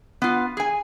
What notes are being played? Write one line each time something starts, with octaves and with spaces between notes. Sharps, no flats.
B3 F4
G#4 G#5